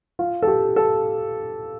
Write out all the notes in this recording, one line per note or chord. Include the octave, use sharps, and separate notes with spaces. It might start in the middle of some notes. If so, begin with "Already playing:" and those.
F4
A4
G4
A4